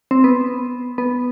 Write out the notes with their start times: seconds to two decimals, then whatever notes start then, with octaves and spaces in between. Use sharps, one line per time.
0.11 C4
0.24 B3
0.98 B3